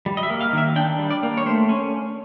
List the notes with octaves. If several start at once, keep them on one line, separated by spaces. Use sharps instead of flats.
G3
D#5
E5
A#3
F5
D#3 E5
D4 G5
G3
D5
A#3
C#5
A3 C5
C#4